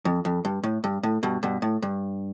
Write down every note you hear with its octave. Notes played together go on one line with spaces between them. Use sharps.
F2
F2
G2
A2
G2
A2
G2 B2
G2 B2
A2
G2